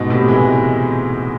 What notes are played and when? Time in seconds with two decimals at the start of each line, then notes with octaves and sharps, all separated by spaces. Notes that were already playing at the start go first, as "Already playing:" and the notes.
Already playing: G#2 B2
0.10 A2 C3
0.28 E3 G#3